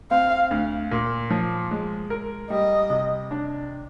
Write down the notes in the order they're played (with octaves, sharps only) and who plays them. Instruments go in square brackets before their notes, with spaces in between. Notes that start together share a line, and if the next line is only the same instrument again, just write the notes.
[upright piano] C4 [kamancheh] F5
[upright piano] D2
A#2
F3
G#3
A#4
[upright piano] G3 [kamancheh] D#5
[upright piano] C3
D4